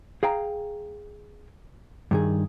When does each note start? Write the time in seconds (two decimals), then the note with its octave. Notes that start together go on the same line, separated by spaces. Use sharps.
0.23 G#4 F5 G5 A#5
2.11 G2 D#3 G#4